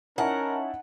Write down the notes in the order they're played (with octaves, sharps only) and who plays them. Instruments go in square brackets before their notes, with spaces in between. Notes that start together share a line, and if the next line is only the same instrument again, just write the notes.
[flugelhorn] C#4 [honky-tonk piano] D#4 E4 A5 [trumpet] A#4 [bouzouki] F#5